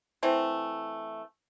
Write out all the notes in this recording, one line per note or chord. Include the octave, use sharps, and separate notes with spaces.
E3 A3 C4